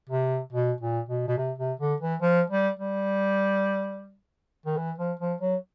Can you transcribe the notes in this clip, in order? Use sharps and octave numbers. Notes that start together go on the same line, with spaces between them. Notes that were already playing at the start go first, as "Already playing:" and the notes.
C3
B2
A#2
B2
B2
C3
C3
D3
E3
F3
G3
G3
D#3
E3
F3
F3
F#3